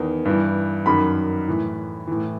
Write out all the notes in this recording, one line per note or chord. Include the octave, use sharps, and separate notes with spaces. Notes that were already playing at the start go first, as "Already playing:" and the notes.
Already playing: E2 D#3
G2 E3
F#2 D#3 B5
A2 E3
A2 E3